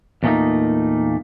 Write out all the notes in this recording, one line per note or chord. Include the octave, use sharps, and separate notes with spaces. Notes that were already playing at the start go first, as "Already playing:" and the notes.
E2 A#2 A3 A#3 D#4